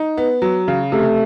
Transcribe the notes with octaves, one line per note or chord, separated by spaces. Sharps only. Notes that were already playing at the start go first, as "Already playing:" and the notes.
Already playing: D#4
B3
F#3
C#3
C3 A3